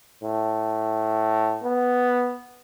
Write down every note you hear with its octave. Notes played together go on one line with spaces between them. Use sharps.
A2
B3